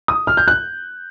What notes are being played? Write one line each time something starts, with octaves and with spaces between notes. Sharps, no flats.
D#6
F6
G6
F#6